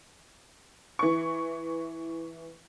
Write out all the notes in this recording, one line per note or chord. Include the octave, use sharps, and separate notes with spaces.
E3 C#6